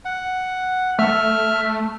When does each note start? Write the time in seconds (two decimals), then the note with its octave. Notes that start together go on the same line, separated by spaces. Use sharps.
0.05 F#5
0.99 A3 E5 F6